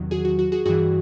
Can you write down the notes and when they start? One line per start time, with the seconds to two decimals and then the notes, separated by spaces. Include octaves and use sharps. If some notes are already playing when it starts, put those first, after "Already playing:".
Already playing: E2 C3 D#3 F#3
0.11 F#4 G#4
0.25 F#4
0.39 F#4
0.52 F#4 G#4
0.65 G2 E3 F#4 G#4